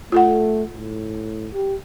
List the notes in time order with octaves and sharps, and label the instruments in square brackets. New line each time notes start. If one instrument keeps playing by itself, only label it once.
[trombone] A3 [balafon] F4 A4 F#5
[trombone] A2
G4